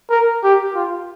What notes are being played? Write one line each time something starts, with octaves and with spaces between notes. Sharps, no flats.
A#4
G4
F4